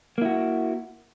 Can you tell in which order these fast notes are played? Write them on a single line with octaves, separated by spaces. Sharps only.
A#3 E4 F#4